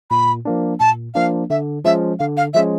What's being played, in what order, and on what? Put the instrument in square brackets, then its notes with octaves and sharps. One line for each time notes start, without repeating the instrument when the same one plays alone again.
[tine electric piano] A#2 [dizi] B5
[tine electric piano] F3 A#3 D4
[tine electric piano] A#2 [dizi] A5
[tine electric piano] F3 A#3 D4 [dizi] F5
[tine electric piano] D3 [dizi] E5
[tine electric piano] F3 G#3 C#4 [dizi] E5
[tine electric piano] D3 [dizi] F5
[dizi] F5
[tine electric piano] F3 G#3 C#4 [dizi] E5